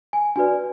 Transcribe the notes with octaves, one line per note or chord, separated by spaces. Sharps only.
G#5
D4 F#4 B4 D5 G#5